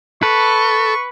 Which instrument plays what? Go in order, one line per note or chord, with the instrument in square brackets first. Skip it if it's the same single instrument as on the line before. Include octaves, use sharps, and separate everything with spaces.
[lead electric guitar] A4 [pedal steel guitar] B4 [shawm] C#6